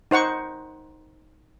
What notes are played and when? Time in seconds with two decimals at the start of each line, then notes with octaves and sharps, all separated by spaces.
0.11 D#4 C5 F#5 C#6